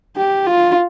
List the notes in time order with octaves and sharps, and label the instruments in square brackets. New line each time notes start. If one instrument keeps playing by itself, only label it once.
[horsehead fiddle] G4
F4